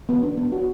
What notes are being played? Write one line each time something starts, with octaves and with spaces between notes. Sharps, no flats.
B3
D4
B3
F#4